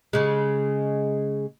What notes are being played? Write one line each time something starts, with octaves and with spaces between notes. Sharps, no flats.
C#3 G#3